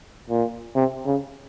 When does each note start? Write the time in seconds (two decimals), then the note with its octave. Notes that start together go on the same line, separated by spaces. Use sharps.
0.30 A#2
0.75 C3
1.06 C#3